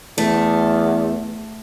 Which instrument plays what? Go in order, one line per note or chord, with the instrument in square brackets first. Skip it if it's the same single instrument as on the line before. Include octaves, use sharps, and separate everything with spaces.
[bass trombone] E2 [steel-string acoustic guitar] A3